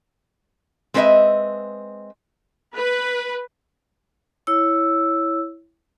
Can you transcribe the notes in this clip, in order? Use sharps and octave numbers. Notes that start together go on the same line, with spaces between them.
G#3 C4 B4 C5 D#5 E5
B4
E4 C#5 E6